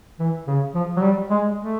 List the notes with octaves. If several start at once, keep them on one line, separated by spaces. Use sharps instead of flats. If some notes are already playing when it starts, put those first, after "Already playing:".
E3
C#3
F3
F#3
G3
G#3
A3